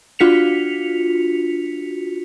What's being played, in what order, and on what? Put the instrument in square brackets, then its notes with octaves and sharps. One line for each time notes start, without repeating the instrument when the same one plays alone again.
[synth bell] D4 F4 F#4 B6 C#7 F7